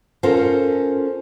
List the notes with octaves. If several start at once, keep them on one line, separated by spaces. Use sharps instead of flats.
C#4 F4 A4 A#4 C5